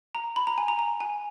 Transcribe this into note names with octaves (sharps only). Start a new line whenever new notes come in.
A#5
B5
A#5
G#5
A#5
A#5
G#5